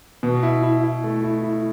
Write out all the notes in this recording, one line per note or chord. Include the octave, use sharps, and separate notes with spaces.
B2
E4
E4
E4
A3
E4
E4